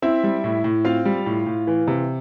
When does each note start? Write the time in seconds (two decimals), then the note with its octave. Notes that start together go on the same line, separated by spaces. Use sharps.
0.02 C4 E4 E5
0.24 G3
0.44 A2
0.64 A2
0.85 C4 F4 F5
1.05 G3
1.26 A2
1.47 A2
1.67 E3
1.88 C3